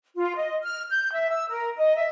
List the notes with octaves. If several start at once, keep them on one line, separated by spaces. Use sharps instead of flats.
F4
D#5
F6
G6
E5
E6
A#4
D#5
E5